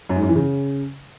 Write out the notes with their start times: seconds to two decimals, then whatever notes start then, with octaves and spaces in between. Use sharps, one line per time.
0.09 F#2
0.16 G#2
0.22 F#2
0.29 E3
0.36 C#3